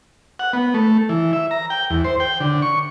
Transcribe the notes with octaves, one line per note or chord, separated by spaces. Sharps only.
F#5
B3
A3
E3
E5
A#5
G5
E2
C5
G5
D3
C#6